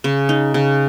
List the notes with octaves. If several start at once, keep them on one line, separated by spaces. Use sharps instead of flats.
C#3
D#4
C#3